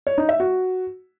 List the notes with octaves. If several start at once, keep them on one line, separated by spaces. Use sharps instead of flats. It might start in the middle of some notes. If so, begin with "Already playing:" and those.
C#5
D#4
E5
F#4